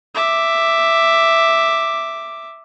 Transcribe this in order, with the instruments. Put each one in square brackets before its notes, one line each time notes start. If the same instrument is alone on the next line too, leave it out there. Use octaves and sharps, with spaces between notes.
[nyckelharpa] E5 D6